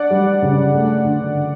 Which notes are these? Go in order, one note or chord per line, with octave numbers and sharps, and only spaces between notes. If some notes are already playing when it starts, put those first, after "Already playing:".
Already playing: D4 D5 F#5
G3
C#3
A3
D3